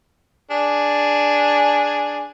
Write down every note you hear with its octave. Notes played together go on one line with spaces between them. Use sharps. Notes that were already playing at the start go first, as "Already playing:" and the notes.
D4 G#4